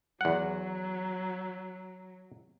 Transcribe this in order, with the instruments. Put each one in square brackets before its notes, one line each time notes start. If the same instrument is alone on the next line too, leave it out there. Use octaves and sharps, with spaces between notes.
[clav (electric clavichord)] E2 F#5 [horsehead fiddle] F#3